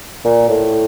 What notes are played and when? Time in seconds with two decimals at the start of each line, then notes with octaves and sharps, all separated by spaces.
0.25 A#2
0.49 A2